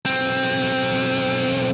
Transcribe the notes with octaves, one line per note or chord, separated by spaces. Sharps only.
B1 C4